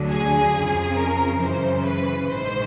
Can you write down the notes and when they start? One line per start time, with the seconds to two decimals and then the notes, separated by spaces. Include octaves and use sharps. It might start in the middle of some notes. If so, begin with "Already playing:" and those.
Already playing: D2 D3 F#3
0.08 G#4
0.52 F2 C#3 F3
0.97 A#4
1.41 F#2 C#3 E3 C5
1.86 B4
2.30 A#1 G#2 D#3 C5